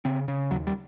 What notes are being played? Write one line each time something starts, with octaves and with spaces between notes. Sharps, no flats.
C#3 C4
C#3
D#2 F#3
G3